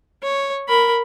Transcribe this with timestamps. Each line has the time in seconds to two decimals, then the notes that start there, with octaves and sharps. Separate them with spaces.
0.23 C#5
0.68 A#4 B5